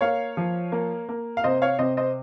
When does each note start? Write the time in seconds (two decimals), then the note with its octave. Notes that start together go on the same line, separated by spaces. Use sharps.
0.01 A#3 C#5 F5
0.37 F3
0.72 A#3
1.09 A#3
1.37 F5
1.44 C3 C5 D#5
1.62 C#5 F5
1.79 C3 C5 D#5
1.97 C5 D#5